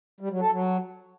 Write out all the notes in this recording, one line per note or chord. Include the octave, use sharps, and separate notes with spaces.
G3
F#3
A4
F#3